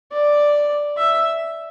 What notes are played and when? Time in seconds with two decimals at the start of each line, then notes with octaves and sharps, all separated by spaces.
0.12 D5
0.97 E5